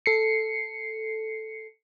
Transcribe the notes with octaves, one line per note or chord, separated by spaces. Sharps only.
A4 C7 C#7